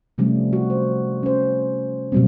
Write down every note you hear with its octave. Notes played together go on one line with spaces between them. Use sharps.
C3 F3 G3 A3 C#4
F#4
C5
C#4 C5
B2 F#3 G3 A#3 C4